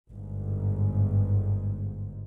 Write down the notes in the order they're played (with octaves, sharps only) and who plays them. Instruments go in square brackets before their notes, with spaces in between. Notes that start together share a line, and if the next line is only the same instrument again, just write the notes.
[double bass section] G1 G#2